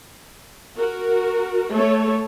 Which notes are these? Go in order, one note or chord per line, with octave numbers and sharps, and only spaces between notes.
F#4 A#4
A3 A4 C#5